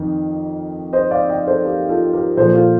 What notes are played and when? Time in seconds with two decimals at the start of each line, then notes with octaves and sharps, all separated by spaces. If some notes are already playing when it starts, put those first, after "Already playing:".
Already playing: F2 D#3
0.93 C5 D#5
1.11 D5 F5
1.29 D#5 G5
1.47 A4 C5
1.65 G4 A#4
1.89 F4 A4
2.13 G4 A#4
2.37 A#2 F3 A4 C5
2.55 F4 A4